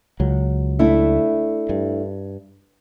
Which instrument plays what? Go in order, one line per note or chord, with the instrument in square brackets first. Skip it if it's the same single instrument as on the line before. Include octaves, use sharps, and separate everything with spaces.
[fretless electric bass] C#2 F#3
[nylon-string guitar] A3 D4 E4
[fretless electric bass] G2